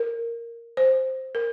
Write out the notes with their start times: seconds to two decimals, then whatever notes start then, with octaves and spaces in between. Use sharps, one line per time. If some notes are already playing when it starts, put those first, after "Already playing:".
Already playing: A#4
0.77 C5
1.35 A#4